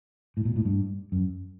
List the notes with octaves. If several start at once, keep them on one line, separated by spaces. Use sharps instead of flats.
A2
A#2
A2
G2
F#2